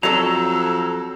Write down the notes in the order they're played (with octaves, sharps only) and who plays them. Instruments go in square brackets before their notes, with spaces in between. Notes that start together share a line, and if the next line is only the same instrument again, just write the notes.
[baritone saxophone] F2 [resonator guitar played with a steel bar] F#3 A4 [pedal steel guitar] A#5 [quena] E6